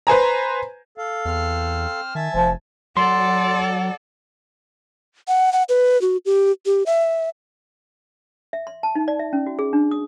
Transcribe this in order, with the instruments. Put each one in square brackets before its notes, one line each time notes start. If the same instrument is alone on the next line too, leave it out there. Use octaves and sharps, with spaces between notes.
[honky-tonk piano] B4 C5 G#5 A#5
[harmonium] A4 F5
[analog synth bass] E2 [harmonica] C4 F6
[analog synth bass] D#3 [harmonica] E5 G#5 A5
[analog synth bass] F1 [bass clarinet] F3
[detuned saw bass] F#3 [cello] A4 D5 [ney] F#5 [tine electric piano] C6
[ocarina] F#5
F#5
B4
F#4
G4
G4
E5
[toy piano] E5
C6
A5
D#4
D5
E5
C#4
F#4
G#4
D4
D#6